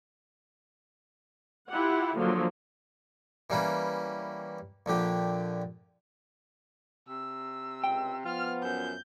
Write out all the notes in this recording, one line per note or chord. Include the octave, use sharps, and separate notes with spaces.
E4 F4 G4 F#5
D3 F3 F#3 A#3
E3 G3 A#3 C#4
A#1 D3 G4
C3 E6
C#2 G5
F3 B3 F4 F6
F#2 G6